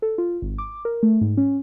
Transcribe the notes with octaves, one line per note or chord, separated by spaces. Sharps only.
A4
F4
G#1
D6
A#4
A3
G#2
C#4